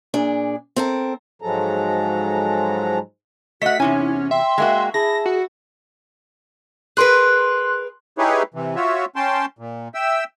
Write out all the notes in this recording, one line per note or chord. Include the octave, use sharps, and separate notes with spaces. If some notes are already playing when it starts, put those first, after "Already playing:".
A#2 D4 G#4
C4 A4 A#4
G#2 F3 F#3 G#3 A4 A#5
A3 F#4 D#5 F#5 B6
E2 C3 C#4 D#4 E4 G#5
E5 G5 C6
G#3 A#3 F#4 C6
E4 G#4 A5 A#6
F#4
G#4 A#4 B4 C6 F#6
D#4 E4 G4 G#4 B4 C#5
C3 E3
F4 F#4 C#5 E5
C#4 G5 A5 C6
A#2
E5 G5 E6